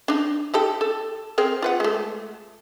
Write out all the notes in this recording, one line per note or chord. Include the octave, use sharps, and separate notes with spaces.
D4 D#4
D#4 G4 A4
A4
C4 G#4 A#4
F4 B4 F#5
G#3 A3